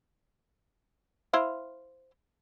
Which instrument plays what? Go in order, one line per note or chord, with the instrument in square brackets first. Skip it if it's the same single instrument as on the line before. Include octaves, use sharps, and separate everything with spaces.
[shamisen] E4 C5 F5